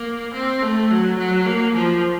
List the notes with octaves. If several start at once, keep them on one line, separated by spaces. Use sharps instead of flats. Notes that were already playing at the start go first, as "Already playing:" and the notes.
Already playing: A#3
C4
A3
F#3
F#3
A#3
F3